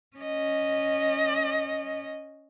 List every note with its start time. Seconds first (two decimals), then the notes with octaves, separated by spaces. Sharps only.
0.17 C#4 D#5